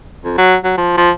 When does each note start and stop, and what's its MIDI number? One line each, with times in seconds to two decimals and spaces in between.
0.25 0.37 41
0.38 0.56 54
0.64 0.73 54
0.78 0.97 53
0.97 1.11 53